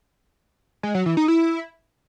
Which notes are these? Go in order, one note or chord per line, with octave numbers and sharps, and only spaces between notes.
G#3
F#3
E3
D#4
E4